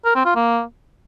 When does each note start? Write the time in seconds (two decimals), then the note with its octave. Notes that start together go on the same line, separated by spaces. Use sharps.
0.05 A#4
0.15 C4
0.25 F4
0.35 A#3